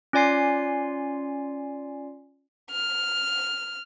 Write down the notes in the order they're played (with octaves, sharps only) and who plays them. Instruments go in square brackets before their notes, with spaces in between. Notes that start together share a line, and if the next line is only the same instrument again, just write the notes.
[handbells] C#4 F4 D5 G#5 C6 C7
[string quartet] F6